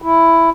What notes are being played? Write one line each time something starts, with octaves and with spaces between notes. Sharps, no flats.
E4